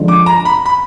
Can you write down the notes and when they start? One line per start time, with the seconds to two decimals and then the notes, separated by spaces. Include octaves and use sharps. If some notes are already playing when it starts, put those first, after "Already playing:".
Already playing: D3 F3 G#3
0.08 D6
0.26 A#5
0.45 B5
0.66 B5